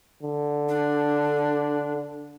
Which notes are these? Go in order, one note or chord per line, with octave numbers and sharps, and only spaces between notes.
D3
D4